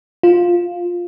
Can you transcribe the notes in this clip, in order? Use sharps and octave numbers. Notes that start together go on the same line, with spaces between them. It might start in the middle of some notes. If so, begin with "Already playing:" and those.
F4